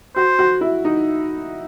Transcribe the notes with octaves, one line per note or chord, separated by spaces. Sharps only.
F#4 C5
F#4
E4
D#4